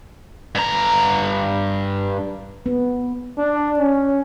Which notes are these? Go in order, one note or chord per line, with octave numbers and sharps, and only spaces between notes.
G2 A#5
B3
D4
C#4